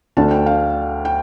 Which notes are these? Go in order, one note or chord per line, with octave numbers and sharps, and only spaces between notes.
D2 D3 A3 D4 A5
G5
F5
G5